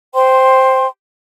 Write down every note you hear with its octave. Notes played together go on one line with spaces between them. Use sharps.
C5 G5 C6